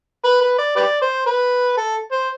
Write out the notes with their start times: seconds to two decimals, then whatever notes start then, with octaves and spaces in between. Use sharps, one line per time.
0.24 B4
0.41 B4
0.58 D5
0.76 G4 B4 D5
1.02 C5
1.26 B4
1.77 A4
2.11 C5